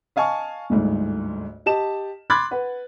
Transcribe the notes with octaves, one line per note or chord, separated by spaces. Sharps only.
D#5 F5 G#5 A5 C#6
G1 D2 G#2
G4 D#5 A5 E7
B5 C6 D6 F#6 G#6 A6
B4 F#5